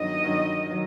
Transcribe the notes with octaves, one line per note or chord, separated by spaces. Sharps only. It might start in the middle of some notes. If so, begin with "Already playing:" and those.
Already playing: G2 D#3 F#3 D#5
G2 D#3 F#3
D#3 F#3